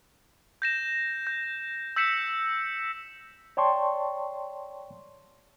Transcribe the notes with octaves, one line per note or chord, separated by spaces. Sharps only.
G6 A#6 E7
G6
E6 G6 B6 C#7 E7
C#5 D5 G5 A5 C6 C#6